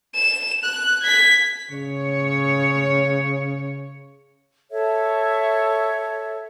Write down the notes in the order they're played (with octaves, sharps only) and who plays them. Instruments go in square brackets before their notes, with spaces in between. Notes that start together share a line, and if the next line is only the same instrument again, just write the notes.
[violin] E7
F#6
G#6 B6
[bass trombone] C#3 [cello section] C#5
[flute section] A4 C#5 E5